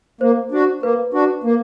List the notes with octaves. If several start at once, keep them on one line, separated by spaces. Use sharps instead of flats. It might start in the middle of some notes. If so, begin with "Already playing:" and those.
A#3 C5
D4 F#4
A#3 B4
D4 F#4
A#3